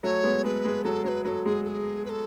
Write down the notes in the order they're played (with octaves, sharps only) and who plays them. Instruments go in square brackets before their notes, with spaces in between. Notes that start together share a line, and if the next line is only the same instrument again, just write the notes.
[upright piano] F#3 A3 [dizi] C#5
[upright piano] G#3 B3
[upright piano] G#3 [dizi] B4
[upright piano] G#3
[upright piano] F#3 [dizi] A4
[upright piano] F#3 [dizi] C#5
[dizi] B4
[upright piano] F#3 [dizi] A4 B4
[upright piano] G#3 [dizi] G#4
[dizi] A4
G#4
B4
A4